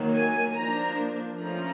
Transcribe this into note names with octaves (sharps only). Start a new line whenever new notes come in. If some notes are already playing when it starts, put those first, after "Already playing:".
Already playing: D#3 F#3 A#3
G#5
F3 A#3 D4 A#5
F3 A3 C#4 A#5